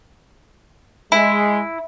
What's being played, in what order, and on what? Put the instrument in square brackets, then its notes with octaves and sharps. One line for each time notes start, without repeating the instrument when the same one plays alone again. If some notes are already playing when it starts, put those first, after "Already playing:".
[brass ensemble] G#3 [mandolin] E4